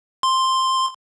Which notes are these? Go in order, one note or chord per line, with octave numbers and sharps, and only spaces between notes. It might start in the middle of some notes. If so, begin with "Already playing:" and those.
C6